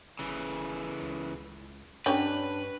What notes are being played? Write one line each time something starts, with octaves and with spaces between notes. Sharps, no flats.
F#1 C#3 E3
C#2
G2 C#4 D4 G4 B4